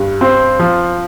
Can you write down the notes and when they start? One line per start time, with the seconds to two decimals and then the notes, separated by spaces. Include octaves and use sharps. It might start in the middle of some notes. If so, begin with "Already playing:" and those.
Already playing: G2
0.21 C4
0.59 F3